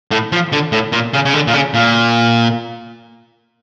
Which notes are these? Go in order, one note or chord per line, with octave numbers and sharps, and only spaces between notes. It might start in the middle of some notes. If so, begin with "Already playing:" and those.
A2
F3
D3
A2
A#2
C#3
C#3
D3
A#2
C#3
A#2